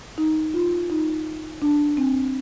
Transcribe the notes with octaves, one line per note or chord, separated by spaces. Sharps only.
D#4
F4
D#4
D4
C4